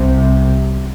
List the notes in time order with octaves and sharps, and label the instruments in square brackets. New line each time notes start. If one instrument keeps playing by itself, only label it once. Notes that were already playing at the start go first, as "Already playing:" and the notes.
Already playing: [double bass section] C2 C3